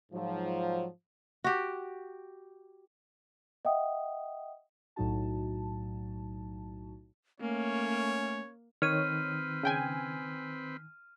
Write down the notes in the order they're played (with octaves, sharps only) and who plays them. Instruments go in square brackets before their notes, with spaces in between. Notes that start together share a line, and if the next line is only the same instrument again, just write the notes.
[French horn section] G#2 F3 F#3
[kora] F#4 G4
[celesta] D#5 E5 F#5 G5 D#6
[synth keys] B1 A2 F#3 D#4 F#4 A5
[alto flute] A3 [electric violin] A#3 [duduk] C#4 [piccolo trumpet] C#5
[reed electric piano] D#3 [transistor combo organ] C4 B4 [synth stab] C#5 [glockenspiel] F6 D#7
[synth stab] C#3 G5 G#5